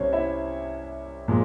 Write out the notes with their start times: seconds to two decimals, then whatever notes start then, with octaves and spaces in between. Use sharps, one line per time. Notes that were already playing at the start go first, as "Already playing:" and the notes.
Already playing: C2 C3 G3 C#4 C5 C#5
0.13 E4 E5
1.28 A#2 F3 G#3